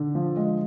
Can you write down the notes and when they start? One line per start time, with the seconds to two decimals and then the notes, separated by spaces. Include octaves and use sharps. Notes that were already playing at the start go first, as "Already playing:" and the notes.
Already playing: D3
0.15 F3
0.37 G#3